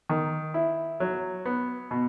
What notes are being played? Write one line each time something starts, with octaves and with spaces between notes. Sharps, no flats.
D#3
E4
F#3
B3
B2